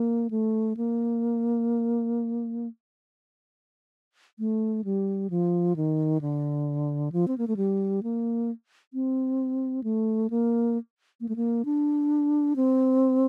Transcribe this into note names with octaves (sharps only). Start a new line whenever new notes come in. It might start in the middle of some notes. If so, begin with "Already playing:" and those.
Already playing: A#3
A3
A#3
A3
G3
F3
D#3
D3
F3
C4
A#3
A3
G3
A#3
C4
A3
A#3
A#3
A3
A#3
D4
C4